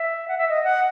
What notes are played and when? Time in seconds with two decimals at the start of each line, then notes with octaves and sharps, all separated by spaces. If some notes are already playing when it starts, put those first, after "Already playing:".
Already playing: E5
0.28 F#5
0.38 E5
0.49 D#5
0.64 F#5